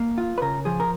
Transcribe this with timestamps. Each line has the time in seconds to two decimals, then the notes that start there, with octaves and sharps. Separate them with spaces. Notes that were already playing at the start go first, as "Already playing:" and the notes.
Already playing: A#3
0.18 F4
0.38 B4
0.42 C#3 A#4
0.65 F3 G#4
0.80 A#4